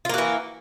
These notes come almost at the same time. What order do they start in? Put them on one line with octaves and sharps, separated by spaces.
F4 A#3 F#4 E3